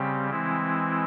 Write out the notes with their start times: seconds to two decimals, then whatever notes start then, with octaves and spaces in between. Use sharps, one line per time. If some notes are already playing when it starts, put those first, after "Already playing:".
Already playing: C#3 G3 C4 G4
0.30 E3 G#3 C4 E4